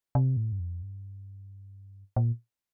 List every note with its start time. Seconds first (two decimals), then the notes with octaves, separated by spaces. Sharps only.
0.15 C3
0.37 A2
0.52 G2
0.60 F2
0.83 G2
2.16 A#2